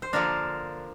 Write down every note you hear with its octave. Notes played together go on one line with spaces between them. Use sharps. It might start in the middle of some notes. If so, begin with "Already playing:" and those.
C5
D3 F3 A#3 D4 A#4